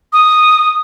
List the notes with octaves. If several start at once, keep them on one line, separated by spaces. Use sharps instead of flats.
D#6